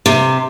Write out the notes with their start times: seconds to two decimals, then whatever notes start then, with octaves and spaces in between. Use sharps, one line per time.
0.06 C3